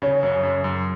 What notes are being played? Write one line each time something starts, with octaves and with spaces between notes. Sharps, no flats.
C#3 C#5
F#2
F#2
F#2